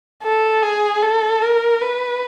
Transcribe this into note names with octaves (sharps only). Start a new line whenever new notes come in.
A4
G#4
A4
A#4
B4